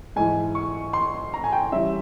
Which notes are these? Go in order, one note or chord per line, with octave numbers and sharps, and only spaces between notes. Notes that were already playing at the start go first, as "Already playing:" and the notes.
G#2 E3 G#3 G#5
C#6
C6
A#5
G#5
G5
E3 G3 C#4 E5